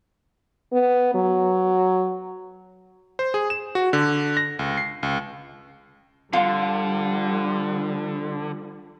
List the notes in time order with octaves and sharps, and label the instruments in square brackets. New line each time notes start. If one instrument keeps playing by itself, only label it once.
[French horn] B3
F#3
[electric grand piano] C5
G#4
E7
F#4
D3
A#6
C#2
C7
C#2
[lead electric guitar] D3 [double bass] F3 G3 [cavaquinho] F4